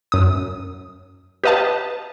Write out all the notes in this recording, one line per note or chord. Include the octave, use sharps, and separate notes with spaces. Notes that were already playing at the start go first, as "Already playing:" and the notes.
F#2 D#6
G4 B4 D#5 F5 A5